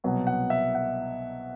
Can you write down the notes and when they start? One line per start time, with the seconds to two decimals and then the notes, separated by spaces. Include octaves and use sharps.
0.04 C2 B2 F#3 B3
0.27 F#5
0.50 E5
0.75 F#5